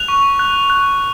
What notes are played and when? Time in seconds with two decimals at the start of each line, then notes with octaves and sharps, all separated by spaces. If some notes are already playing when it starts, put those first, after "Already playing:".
Already playing: F#6 F7
0.08 C#6
0.39 F#6
0.70 F#6